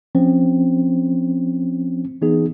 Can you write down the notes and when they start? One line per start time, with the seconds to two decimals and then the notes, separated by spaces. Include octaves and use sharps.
0.15 F3 C4 C#4 C5
2.22 E3 B3 D#4 G#4